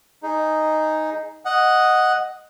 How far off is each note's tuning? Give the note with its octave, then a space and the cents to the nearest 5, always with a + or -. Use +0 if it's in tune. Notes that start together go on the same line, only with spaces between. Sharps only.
D#4 +0 G#4 +0
D#5 +0 F#5 +0